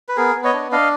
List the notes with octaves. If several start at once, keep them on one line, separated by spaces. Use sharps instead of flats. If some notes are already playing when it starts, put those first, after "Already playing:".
B4
B3 G#4 A#4
B3
C#5 D#5
D4
D4 D#5 F5